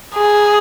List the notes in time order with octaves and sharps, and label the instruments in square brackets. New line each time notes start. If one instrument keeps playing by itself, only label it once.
[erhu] G#4